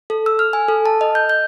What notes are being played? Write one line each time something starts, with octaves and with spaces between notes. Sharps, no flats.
A4
E6
F6
G#5
A4
A5
D#5
G6
G6